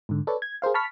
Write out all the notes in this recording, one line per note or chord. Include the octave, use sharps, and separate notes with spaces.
G#2 D3
A4 B4 C#5 D5
G#6
G#4 A#4 C5 F5
A5 B5 C#6 F6 B6